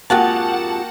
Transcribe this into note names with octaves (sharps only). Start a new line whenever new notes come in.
F2 G#2 A#3 F#4 G4 F#5 G5 A5